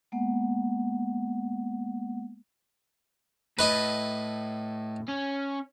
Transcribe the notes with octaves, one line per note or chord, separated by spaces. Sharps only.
G#3 A#3 B3 F#5
A2 B4 D#5 B5
C#4